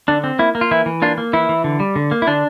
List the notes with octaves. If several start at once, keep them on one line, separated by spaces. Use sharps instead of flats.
D3 D4
C4
A#3 E4
A#3
F4
E3 E4
E3
A#3 D4 F4
A#3
E3 E4
E3
D3
G3
D3
A#3
E4
D3 D4